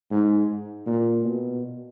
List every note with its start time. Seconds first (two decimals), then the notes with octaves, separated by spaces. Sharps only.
0.11 G#2
0.86 A#2
1.24 B2